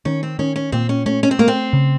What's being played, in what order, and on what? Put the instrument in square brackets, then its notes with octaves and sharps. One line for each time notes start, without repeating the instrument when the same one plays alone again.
[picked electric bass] D#3 [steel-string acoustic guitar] C#4
[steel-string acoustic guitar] C4
[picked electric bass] D#3 [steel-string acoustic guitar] C#4
[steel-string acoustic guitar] C#4
[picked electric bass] A#2 [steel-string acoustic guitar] C4
[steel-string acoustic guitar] C#4
[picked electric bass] A3 [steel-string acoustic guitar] C#4
[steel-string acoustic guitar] C#4
C4
[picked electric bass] A3 [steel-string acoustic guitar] A#3
[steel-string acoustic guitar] C4
[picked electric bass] C#3